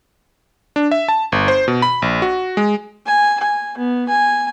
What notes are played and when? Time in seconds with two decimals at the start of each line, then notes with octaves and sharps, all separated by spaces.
0.76 D4
0.91 E5
1.08 A5
1.32 G1
1.48 C5
1.68 B2
1.82 B5
2.02 A#1
2.22 F#4
2.57 G#3
3.06 G#5
3.40 G#5
3.78 B3
4.09 G#5